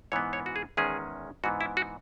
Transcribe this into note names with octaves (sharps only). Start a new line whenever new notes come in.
G#2 E3 B3 C#5
C#5
F#4
G#4
E2 D#3 G#3 C#4 G#4
G#2 E3 B3 F#4
E4
F#4